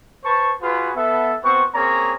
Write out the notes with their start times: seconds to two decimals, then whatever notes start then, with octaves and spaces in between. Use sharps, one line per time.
0.24 B4 C5 A5 C#6
0.62 F4 F#4 G#4 B4
0.95 B3 A4 E5
1.43 B3 C4 F#4 C5 C#6
1.74 A#3 C4 C#4 G#4 C#5 A#5